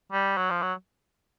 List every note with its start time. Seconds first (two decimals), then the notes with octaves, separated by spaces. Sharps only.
0.12 G3
0.37 F#3
0.50 F3
0.62 F#3